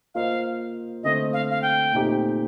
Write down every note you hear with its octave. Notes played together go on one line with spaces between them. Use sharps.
A#3 F4 C5 D#5 F5
D3 A3 C4 D#5
F5
F5
G5
A#2 A3 C4 D#4 G4